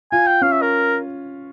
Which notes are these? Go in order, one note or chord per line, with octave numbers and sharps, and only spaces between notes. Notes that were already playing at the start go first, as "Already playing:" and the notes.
F4 G#5
G5
C#4 F5
E5
A#4